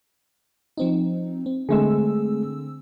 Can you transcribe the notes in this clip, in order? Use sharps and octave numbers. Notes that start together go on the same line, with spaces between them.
F3 C4 D#4
C4
D3 G#3 A3 C4 G#4 E6